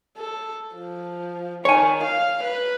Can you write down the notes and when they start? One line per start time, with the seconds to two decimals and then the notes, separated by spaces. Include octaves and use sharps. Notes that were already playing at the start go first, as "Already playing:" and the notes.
0.17 A4
0.76 F3
1.65 D#3 C#5 G#5
2.04 F5
2.44 B4